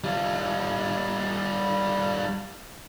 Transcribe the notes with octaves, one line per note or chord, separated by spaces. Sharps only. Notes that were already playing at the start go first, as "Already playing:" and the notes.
G3 F4